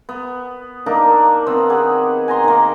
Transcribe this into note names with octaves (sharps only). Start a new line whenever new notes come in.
B3
A#3 D4 D#4 A#4
D#3 B3 C4
G4 G#4 F#5
G#5 A#5 C6
D#3 A#3